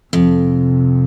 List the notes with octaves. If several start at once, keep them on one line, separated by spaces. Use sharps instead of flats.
F2 C3